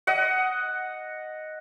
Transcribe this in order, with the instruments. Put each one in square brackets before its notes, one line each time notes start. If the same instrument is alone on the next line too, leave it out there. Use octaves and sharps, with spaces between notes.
[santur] D#5 F#5